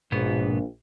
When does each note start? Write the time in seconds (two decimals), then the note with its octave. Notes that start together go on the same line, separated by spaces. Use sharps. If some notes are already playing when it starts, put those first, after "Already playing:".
0.12 A#1 G#2 B2 B3